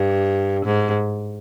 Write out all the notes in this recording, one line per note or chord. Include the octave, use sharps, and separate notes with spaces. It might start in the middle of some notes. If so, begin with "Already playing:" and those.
Already playing: G2
G#2